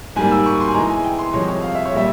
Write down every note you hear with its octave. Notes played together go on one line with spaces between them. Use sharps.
G#2 G3 A#3 G#5
E6
C#6
C6
G#5
E2 E3 G#3 A#5
G#5
G5
C6
C2 C3 F3 G#3 C#5
C#5
F5
E5
C#5
A#2 G3 E5